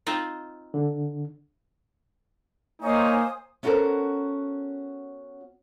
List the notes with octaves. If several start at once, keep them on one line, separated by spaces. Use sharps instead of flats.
C4 D#4 F4
D3
A#3 D#4 C5 C#5 D#5 G#5 D#6
B3 C#4 F#4 A4 A#4 C5